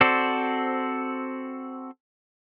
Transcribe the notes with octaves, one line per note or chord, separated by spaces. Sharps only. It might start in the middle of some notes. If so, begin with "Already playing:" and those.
C4 F#4 A4 C5 D5